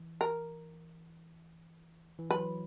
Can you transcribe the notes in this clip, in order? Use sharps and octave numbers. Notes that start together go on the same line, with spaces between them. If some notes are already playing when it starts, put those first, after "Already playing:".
Already playing: E3
A#4
E3
F#3 B4